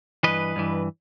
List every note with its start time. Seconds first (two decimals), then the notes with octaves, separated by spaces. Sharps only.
0.23 G2 E3 B4 D#5
0.56 G2 E3